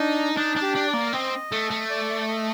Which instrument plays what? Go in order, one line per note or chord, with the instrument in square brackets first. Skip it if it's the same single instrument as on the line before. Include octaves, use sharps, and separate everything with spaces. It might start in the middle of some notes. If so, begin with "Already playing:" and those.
Already playing: [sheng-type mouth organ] D4 [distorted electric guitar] D#4
[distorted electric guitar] D4 [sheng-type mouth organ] D#4
[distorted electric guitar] D4
[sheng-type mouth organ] G4
[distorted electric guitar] D4
[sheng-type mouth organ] D5
[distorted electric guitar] A#3
[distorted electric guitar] C4 [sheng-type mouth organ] D#5
[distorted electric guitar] A3
A3
[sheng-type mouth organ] D5
D#5